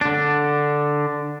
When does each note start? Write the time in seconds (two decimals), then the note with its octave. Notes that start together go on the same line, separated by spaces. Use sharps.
0.01 D3 D4